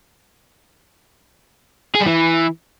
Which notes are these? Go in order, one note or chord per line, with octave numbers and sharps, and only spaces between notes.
G#4
G3
E3